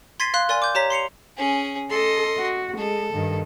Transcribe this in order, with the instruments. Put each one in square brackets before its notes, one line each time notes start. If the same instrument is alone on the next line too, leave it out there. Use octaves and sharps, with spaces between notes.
[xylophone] C6 G#6 A6 B6 C7 D#7
F5 C6 F#6
A#4 D5 G#5 C6
D6 G6
G4 C#5 A#5 B6
C6 C7 C#7 F7
[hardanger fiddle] C#4 G#4
[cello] A4 [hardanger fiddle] D#5 C6
[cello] F#4
[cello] G#3 [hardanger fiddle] A4
[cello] G2 D#3